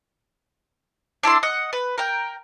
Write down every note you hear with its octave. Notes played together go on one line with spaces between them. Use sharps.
D4 E4 A4 C6
D#5 F#5
B4
A#4 G5